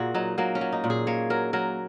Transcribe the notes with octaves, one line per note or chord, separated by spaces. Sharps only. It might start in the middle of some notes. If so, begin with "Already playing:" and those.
Already playing: A#2 A#3 F#4 G#4
F#3 D#4
F#3 A#3
C#4
F#3
D#4
A#2
G#4
A#3 C#5
F#3 A#4
F#3 A#4